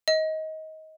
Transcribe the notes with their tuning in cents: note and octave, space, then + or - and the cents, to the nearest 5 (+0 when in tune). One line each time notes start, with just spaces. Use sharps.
D#5 +20